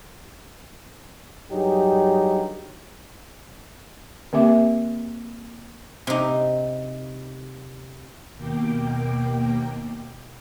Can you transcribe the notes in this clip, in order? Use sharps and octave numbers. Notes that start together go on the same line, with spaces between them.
G2 F#3 D#4 G4 G#4
D3 A#3 C4 G4 E5 D6
C3 D#4
D#2 B2 A#3 G5 D6